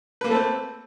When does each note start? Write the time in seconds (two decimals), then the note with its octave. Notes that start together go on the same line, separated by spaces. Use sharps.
0.21 B4
0.24 A#3
0.28 A4
0.31 A3
0.34 C4